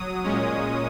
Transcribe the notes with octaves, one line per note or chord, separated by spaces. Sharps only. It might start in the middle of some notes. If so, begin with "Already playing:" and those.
Already playing: F#3 D#6
A#2 G#3 C#4